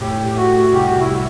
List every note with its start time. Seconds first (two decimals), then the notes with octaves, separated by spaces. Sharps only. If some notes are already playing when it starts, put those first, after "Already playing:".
0.01 A2 G4
0.28 G4
0.36 A3 F#4
0.72 C2 G4
0.86 F#4
1.00 E4
1.08 G3